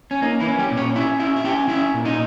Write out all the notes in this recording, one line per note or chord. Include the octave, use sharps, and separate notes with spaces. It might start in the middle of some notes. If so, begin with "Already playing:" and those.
C#4
A#3 D#4
E3 E4
C#4
G3 G4
A#2
C#4 C#5
C#4 E4 E5
C#4 E4 E5
E5
C#4 G4 G5
C#4 E4 E5
A#2
D#4 D#5